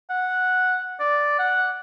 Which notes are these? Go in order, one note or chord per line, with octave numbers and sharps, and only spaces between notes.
F#5
D5
F#5